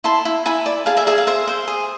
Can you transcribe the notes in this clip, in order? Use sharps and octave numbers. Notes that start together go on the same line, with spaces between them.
E4 A5 C6
E4
E4 G#5 B5
D5
G#4 F5 A5
E5 G#5
G#4 E5 G#5
F5
C5 E5
C5
G#4